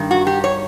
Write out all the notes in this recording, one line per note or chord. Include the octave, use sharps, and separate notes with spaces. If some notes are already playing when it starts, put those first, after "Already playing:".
Already playing: G2 D#3
F#4
G4
C#5